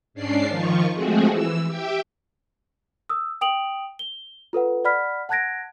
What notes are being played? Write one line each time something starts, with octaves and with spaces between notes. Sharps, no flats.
G#2 C#4 D4 D5 C7
D#3 F3 F4 C#6
F3 G#3 A3 C4 F#4 G#4
E3 E6
G4 E5 G5
D#6 E6
G5 D#6 D7 F7 F#7
G7
F4 A4 B4 F#5
D5 F#5 B5 F6 B6
F#5 A5 F#6 G#6 A#6 D7